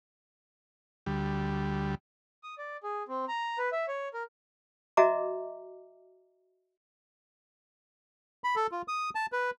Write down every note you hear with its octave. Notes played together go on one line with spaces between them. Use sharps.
D2 G3
D#6
D5
G#4
C4
A#5
B4
E5
C#5
A#4
F#4 D#5 E5 A#5 D6
B5
A4
F4
D#6
A5
B4